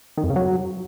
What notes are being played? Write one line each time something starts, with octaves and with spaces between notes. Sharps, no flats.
D#3
F2
C#3
F#3